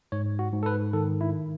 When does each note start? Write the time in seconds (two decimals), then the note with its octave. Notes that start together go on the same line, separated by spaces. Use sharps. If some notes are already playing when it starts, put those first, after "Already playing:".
0.12 G#2 C#5
0.39 F#4
0.53 G#2
0.63 A4
0.66 B4
0.93 D#3 A4
1.21 E4